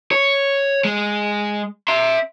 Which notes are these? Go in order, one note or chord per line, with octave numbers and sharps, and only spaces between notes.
C#5
G#3
E5 C6